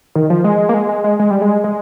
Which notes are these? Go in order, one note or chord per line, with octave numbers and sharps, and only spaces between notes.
D#3
F3
G#3
A#3
G#3
G#3
G#3
G#3
G3
G#3
G#3